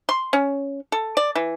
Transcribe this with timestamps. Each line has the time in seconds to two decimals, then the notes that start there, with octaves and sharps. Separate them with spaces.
0.09 C6
0.33 C#4
0.92 A4
1.17 D5
1.35 E3